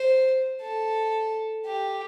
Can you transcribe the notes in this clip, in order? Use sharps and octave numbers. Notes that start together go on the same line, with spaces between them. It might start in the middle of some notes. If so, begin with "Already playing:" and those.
Already playing: C5
A4
G4